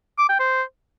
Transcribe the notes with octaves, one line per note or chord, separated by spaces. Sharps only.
D6
G5
C5